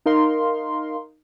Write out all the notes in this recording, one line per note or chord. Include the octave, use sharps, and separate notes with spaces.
D#4 A#4 F5 C6